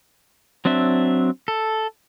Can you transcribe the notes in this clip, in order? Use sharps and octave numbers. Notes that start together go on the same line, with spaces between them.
F#3 C4 D4 E5
A4